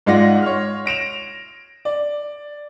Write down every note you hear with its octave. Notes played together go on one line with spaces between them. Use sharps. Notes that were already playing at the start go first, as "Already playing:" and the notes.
G#2 G#3 F4 D5 F#5 A#6
C#5 C6 F6
A#6 D7 E7 F7
D5